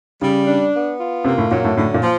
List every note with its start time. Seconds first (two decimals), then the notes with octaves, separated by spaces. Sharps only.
0.22 C#3 G3
0.47 D4
0.73 B3
0.99 F4
1.24 C3 A#3
1.38 A2
1.50 A#2 F#3
1.64 A2
1.77 A2 D3
1.94 A#2
2.02 F3